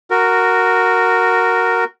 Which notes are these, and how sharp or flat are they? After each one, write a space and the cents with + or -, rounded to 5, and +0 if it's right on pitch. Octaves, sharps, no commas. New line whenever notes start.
F#4 +0 A#4 -5